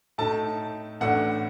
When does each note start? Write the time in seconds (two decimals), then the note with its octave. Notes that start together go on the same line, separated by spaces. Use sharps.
0.18 A2 A3 D#4 A5
1.01 A1 A2 A3 D4 F#5